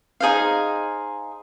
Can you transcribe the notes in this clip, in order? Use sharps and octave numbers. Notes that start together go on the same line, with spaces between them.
D#4 G#4 C5 F5